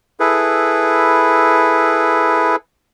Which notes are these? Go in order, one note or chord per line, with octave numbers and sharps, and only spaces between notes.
E4 G#4 A4 B4